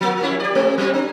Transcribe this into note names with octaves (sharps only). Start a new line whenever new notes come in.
F3 A#3
G3 C#4 E4
G4 D5
G#3 C4
F#3 G3 C4
D4